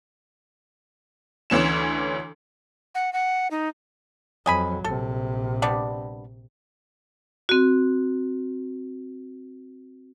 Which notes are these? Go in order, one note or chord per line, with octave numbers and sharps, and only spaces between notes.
D2 E3 C#4 E7
F#5
F#5
D#4
F2 F#3 D#5 G#5 B5
A#1 C3 A4
G3 B3 D4
C4 F#4